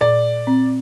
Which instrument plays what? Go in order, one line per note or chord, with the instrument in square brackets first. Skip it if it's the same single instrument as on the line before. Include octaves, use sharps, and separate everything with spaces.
[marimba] A#2 [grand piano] D5
[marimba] C4